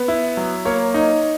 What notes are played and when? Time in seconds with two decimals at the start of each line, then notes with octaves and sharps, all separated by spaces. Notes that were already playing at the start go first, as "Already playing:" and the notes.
Already playing: B3
0.08 E4
0.37 F#3
0.65 A#3 C#5
0.94 D#4